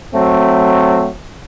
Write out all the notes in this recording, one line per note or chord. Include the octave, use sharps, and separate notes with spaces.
F#3 A3 C4